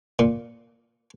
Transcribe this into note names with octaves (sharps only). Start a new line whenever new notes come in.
A#2